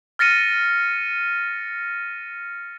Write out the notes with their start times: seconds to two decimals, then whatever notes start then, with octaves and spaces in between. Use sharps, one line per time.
0.19 F6 A6 A#6 C#7 D#7